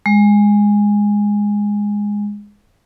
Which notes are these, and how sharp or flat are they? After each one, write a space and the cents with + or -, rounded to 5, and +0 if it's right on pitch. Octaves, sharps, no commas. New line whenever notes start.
G#3 -10